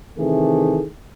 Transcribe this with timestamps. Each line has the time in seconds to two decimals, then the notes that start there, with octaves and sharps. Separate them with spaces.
0.18 C3 D#3 E3 A3 G#4